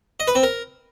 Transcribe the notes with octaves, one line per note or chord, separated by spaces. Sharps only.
D#5
B4
C4
A#4